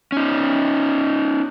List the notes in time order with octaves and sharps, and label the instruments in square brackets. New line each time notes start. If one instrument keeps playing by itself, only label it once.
[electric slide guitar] C#4 D#4